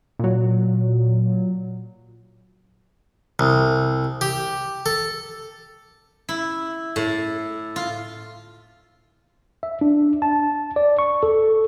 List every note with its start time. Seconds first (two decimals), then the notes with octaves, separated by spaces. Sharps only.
0.19 A#2 F#3
3.39 C2
4.21 G4
4.86 A4
6.29 E4
6.96 A2
7.76 F4
9.63 E5
9.81 D4
10.22 A5
10.76 D5
10.99 C#6
11.23 A4